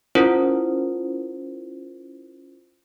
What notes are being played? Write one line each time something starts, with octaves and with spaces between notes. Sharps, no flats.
C#4 E4 F4 A#4 C5